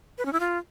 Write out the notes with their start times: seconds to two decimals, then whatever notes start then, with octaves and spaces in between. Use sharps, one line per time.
0.18 B4
0.25 C#4
0.33 E4
0.40 F4